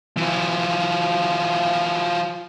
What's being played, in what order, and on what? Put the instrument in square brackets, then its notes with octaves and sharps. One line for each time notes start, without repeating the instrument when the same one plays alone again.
[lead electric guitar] E3 F3